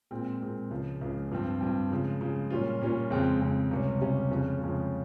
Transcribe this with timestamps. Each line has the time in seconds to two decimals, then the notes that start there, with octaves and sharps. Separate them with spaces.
0.11 A#2 G#3 C4
0.42 A#2 G#3 C4
0.71 C#2 C#3 F3
1.01 C#2 C#3 F3
1.31 G2 F3 C4
1.61 G2 F3 C4
1.91 C#3 F3 G#3
2.21 C#3 F3 G#3
2.50 A#2 G3 C#4 F4
2.81 A#2 G3 C#4 F4
3.10 F2 C#3 G#3 C4
3.41 F2 C#3 G#3 C4
3.71 C#2 C3 G3 C#4
4.01 C#2 C3 G3 C#4
4.31 F2 C#3 F3 G#3 C#4
4.61 F2 C#3 F3 G#3 C#4